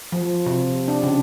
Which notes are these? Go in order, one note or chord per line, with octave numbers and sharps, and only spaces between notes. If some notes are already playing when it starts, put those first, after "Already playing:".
F3
C3
D4
C#3